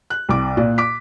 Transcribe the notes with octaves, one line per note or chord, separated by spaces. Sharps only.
F#6
C2 D6
A#2 D5
D6 B6